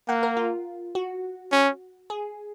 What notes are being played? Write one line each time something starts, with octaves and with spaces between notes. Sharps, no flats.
A#3 F#5
A#4
F4
F#4
C#4
G#4